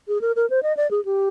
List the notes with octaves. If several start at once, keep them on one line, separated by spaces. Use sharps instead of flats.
G#4
A#4
A#4
C5
D#5
D5
G#4
G4